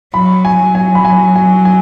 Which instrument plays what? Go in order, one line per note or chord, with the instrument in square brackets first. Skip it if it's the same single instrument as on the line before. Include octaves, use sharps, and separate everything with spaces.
[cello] F#3 [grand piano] B5
[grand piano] G#5
[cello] F#3
[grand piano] G#5
B5
G#5
G#5
G#5